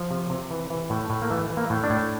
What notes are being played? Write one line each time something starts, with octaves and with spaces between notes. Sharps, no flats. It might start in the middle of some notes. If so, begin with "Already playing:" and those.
Already playing: F3
C3
C3
E3
E3
A2
A2
A#3
E3 A3
E3
A#3
A2
D4
A2